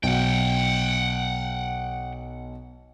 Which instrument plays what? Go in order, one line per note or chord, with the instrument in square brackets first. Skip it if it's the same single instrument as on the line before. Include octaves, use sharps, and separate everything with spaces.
[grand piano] B1 [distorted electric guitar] F#5 G5